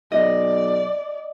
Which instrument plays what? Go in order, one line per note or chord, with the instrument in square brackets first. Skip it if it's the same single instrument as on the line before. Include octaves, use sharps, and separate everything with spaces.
[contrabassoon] B1 [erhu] D5 [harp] D#5